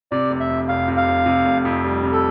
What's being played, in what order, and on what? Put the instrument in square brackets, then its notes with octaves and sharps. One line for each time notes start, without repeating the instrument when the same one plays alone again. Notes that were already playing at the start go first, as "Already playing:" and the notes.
[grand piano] C3 [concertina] D5
[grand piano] F1
[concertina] E5
[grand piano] F2
[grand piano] F1 [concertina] F5
[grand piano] C3
[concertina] F5
[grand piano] F1
C3
F1
F2
G3
C3
[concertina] A4